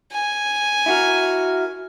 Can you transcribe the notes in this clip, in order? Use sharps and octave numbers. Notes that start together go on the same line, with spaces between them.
G#5
E4 F#4 A#4